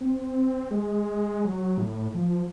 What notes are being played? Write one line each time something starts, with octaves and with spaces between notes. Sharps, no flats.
C4
G#3
F#3
A2
F3